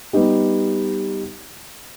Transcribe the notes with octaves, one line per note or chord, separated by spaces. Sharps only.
G3 B3 D#4 G4